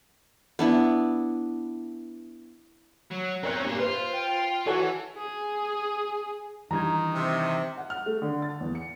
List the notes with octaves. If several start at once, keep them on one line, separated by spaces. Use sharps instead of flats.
B3 D4 E4
F#3
C4 C#4 A#4 C#5 F#6
G2 A#2 A#3 D4
F4 B4 C5
G5
E3 F#4 A4 C#5 G#5
G#4
D#3 E3 G3 D4 A#5 G#6
C3
F#5
F6
A3
D3
A6
E2
C#7